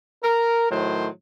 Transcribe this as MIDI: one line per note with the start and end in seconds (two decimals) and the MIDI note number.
0.23 0.69 70
0.71 1.08 45
0.71 1.08 51
0.71 1.08 54
0.71 1.08 72